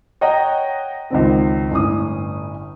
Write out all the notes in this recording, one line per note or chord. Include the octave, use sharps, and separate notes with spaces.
C#5 D#5 F#5 G5 A#5
C#2 D#3 C4
G1 A2 C#4 D#6